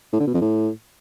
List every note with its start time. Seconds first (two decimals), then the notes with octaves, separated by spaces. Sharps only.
0.13 A2
0.20 D3
0.27 B2
0.34 F2
0.41 A2